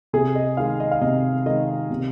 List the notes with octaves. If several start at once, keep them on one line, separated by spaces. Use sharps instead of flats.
C3 G#4
D#5
D#3 G#3 F5
D#5
F5
C3 D#5
D#3 G#3 D#5
C3